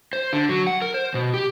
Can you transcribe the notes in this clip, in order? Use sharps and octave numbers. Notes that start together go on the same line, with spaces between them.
C5
D3
F#3
F#5
A#4
C5
B2
G4